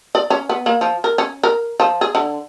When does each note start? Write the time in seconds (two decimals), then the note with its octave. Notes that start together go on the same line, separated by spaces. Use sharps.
0.15 D5
0.30 C#4
0.49 B3
0.66 A#3
0.81 F3
1.04 A#4
1.18 C#4
1.43 A#4
1.80 F3
2.01 G#4
2.15 D3